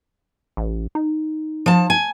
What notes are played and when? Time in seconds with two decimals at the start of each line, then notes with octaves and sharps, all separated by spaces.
0.57 A1
0.95 D#4
1.66 F3 A5
1.90 G#5